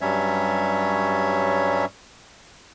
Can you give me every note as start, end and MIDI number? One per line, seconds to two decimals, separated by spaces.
0.01 1.85 43
0.01 1.85 54
0.01 1.85 55
0.01 1.85 61
0.01 1.85 73
0.01 1.85 76